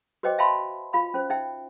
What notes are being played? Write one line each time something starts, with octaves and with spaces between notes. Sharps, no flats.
F#4 B4 C5 D#5 G5 D6
E5 F5 G5 A5 B5 C6
F4 F5 B5
C#4 C5
D#4 E5 G5